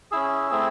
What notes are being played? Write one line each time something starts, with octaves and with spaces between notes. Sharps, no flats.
C#4 E4 G#4 E6
A3 C4 E4 G#4